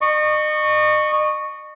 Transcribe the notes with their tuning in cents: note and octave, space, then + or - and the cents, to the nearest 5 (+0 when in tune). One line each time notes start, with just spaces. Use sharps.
D#5 -40 C#6 +0